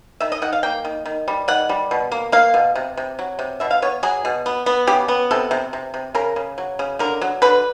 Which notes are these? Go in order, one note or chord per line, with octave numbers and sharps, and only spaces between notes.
D#3 E5
D#5
D#3 F#5
F5
A#3 G5
D#3
D#3
G3
D#3 F#5
G3
B2
A#3
A#3 F5
B2
C3
C3
F#3
C3
B2 E5
F5
B3 C#5
F#3 G#4
B2
B3
B3
C#3 G4
B3
C3 A4
C3
C3
C3
C#3 A#4
C#3
F#3
C#3
D3 A#4
F#3
D3 B4